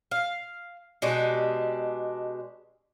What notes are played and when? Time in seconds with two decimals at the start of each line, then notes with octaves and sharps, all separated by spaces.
0.11 F5
1.02 B2 G#3 D4 G4